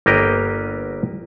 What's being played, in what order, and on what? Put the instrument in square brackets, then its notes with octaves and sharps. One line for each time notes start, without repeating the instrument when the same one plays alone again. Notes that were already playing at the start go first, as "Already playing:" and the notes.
[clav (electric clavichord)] G1 A#3 B3 G4 A#4 D#5